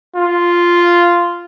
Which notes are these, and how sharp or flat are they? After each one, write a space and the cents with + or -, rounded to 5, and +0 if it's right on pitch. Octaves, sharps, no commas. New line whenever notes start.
F4 -5